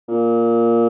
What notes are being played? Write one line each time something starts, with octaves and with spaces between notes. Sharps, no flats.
A#2